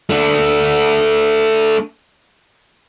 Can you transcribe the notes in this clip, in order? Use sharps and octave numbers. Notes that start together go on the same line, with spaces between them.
A3 D4